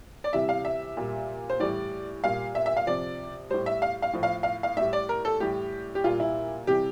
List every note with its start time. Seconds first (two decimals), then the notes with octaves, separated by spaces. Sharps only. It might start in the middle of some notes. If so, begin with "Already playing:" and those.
0.24 D5
0.33 C3 E3 G3 E5
0.49 F5
0.65 E5
0.97 A#2 G3
1.50 C5
1.60 A2 E3 G3 D5
2.24 A#2 G3 F5
2.55 E5
2.66 E5
2.77 F5
2.87 C3 F3 D5
3.50 A2 G3 C5
3.66 E5
3.82 F5
4.02 F5
4.13 A2 F3
4.23 F5
4.43 F5
4.63 F5
4.77 A2 G3 E5
4.93 D5
5.09 A#4
5.25 A4
5.40 A2 E3 G3 G4
5.95 G4
6.04 A#2 G3 F4
6.20 E4
6.67 C3 E3 G3 G4